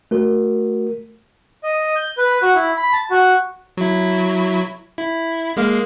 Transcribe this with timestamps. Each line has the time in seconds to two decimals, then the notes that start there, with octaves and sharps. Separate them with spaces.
0.11 A3 F#4 A#4
1.63 D#5
1.96 G6
2.18 B4
2.42 F#4
2.55 E4
2.77 B5
2.93 A5
3.11 F#4
3.77 F#3 E4
4.98 E4
5.57 G#3 A#3 F5